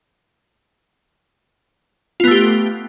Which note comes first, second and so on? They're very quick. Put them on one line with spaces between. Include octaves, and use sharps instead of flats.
F4 B3 A3 G4